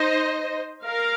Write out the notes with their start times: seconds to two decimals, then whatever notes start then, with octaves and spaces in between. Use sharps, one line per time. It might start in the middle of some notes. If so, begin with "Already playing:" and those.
Already playing: D#4 C5 D#5
0.85 A#4 F5